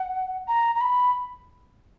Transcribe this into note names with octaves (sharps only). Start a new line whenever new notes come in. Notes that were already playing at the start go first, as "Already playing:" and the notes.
Already playing: F#5
A#5
A#5
B5